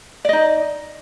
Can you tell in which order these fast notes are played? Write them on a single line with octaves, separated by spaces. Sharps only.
D5 D#5 D#4